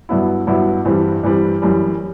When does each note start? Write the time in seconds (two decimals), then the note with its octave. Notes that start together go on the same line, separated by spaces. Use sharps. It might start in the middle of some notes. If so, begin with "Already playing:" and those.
0.09 G2 F#3 B3 E4
0.47 G2 F#3 B3 E4
0.85 G2 E3 G3 C4
1.23 G2 E3 G3 C4
1.62 F#2 E3 G3